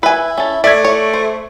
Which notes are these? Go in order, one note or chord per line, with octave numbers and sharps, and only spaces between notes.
E4 B4 G#5
C#4 A4
A3 D5 E5 G#6
C#5
C5